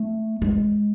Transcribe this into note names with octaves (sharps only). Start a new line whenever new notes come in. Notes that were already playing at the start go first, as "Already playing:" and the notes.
Already playing: A3
G#3